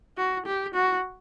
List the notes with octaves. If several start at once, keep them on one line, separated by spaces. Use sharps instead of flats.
F#4
G4
F#4